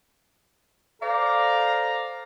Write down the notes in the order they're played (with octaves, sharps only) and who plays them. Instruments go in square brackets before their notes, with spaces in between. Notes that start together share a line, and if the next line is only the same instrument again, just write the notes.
[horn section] A4 C5 D5 F5 A#5